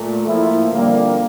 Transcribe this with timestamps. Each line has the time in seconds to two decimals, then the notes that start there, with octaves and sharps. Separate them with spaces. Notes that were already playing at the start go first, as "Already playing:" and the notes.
Already playing: A#2 A3
0.26 A2 F3 A#3 E4
0.71 F2 D3 G3 A#3